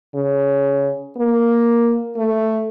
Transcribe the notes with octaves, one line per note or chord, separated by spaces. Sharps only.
C#3
A#3
A3